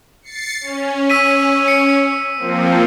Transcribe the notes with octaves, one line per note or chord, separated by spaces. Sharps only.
A6 C7 C#7
C#4
E6 B6 D#7
C#7
F3 A#3 C4